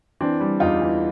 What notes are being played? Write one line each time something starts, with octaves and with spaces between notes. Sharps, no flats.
E3 C4 D4
G3
E2 D#4 F4
E3